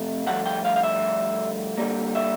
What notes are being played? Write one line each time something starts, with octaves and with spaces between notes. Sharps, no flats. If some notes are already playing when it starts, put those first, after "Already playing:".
Already playing: F2 C3 A3
G2 D3 F3 A3 F#5
G5
F5
F5
E5
G2 D3 G3 A#3
E5